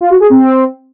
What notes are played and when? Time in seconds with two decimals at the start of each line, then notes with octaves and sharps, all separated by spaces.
0.01 F4
0.10 F#4
0.20 G#4
0.30 C4